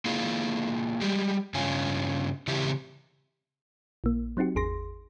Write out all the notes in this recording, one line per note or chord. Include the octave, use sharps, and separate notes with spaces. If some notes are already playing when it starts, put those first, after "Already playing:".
A#3 E4 F4 G#4
G3 G#3 G4
G2 C#3 C#4 F4 G#5
C#3 E3 C4 E4 G4
A#1 A#3
F#3 C4 D#4 F#4 G4
G#1 E2 G#4 C6 A#6